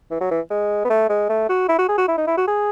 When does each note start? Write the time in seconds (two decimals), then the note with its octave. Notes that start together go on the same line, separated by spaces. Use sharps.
0.10 E3
0.20 F#3
0.31 E3
0.50 G#3
0.85 B3
0.90 A3
1.09 G#3
1.29 A3
1.49 F#4
1.68 E4
1.78 F#4
1.88 G#4
1.98 F#4
2.08 E4
2.17 D#4
2.27 E4
2.37 F#4
2.47 G#4